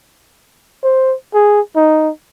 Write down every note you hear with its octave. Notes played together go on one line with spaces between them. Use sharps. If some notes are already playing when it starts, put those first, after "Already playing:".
C5
G#4
D#4